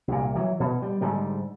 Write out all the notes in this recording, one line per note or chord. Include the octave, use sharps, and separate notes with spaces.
C2 A#2
E3 F#3
B2
G3
G#2 D3 G3